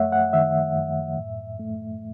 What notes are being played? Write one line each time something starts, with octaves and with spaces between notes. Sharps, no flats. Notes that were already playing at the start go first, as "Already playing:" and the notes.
Already playing: F#2 A3 C#5 E5 F#5
F#5
D#3 E5
F#2
A2
A3